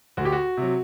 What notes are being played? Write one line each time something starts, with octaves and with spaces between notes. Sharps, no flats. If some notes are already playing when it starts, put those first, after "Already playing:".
D2 F#4
G4
F#4
C3 F#3